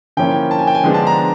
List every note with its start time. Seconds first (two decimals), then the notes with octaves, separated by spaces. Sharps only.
0.17 D3 F3 A#3 C#4 E4 G5
0.51 A5
0.59 G#5
0.67 G5
0.75 G#5
0.84 D3 F3 G#3 B3 D4
0.94 A5
1.07 A#5